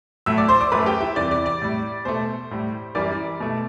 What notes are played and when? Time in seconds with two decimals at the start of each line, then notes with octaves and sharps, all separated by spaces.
0.26 A2 F#3 A3 E5 E6
0.37 D5 D6
0.48 C5 C6
0.60 D5 D6
0.72 F#2 F#3 A3 B4 B5
0.86 G4 G5
1.01 E4 E5
1.16 E2 C3 E3 G3 D5
1.31 D5
1.46 D5
1.62 A2 G3
2.05 B2 A3 C5
2.51 A2 G3
2.95 F#2 E3 G3 D5
3.40 B2 A3